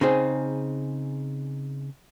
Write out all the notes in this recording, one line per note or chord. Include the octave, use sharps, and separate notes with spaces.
C#3 C4 D#4 G#4